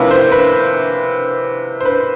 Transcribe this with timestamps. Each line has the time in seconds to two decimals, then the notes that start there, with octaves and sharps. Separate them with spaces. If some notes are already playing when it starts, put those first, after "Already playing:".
Already playing: C3 F3 A#3 C#4 E4 B4
0.11 C5
0.32 B4
1.81 C5
1.85 B4